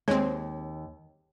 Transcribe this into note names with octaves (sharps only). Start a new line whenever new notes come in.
D#2 G#3 C4 C#5